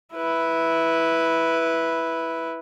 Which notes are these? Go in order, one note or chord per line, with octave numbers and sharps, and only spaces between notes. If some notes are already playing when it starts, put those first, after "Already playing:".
E4 B4